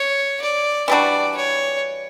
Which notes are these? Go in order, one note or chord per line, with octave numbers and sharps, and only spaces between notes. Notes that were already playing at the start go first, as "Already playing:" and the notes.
Already playing: C#5
D5
E3 G3 D4 F#4 D5
C#5